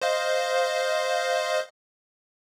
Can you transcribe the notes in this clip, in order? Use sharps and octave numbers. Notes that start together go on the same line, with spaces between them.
C5 D#5 F5